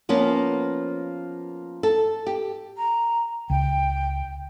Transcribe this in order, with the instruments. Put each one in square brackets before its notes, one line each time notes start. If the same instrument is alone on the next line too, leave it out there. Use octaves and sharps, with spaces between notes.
[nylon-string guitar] F3 A#3 B3 C#4
A4
G4
[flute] A#5
[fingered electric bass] C#2 [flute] G5